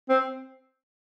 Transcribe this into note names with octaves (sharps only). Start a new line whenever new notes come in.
C4